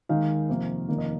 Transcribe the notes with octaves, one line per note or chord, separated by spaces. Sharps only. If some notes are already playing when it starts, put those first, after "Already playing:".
D#2 D#3 G#3 D#4 F5
F2 C3 D#3 A#3
F1 D#2 D#3 A#3 D#4
D#5